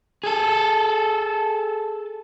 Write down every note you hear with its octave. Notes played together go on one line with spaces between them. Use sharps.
G#4 A4